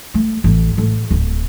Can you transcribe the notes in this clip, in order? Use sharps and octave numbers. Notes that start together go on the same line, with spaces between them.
A3
A1
A2
D1